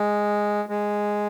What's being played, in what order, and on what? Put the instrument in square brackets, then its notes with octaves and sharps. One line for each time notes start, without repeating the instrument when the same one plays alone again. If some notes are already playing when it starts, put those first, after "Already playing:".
Already playing: [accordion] G#3
G#3